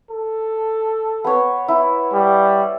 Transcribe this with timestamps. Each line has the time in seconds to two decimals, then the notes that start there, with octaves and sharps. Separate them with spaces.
0.11 A4
1.24 B3 C#5
1.68 E4
2.13 G3